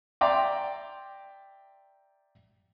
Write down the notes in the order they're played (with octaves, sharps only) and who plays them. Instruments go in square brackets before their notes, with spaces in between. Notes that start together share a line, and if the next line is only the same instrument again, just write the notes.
[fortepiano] D5 E5 G5 A#5 C6 D6